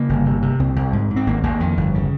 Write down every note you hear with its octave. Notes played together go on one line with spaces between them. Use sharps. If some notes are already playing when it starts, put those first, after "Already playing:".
Already playing: C#3 A#3
G1
C3
C3
C2 C4
C2
G#2
G#2
C4
G#1 A#3
G#1 A#3
F2 D#3
G1
C#3